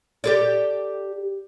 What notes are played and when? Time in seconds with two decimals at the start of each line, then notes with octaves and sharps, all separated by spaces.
0.24 G4 A4 D5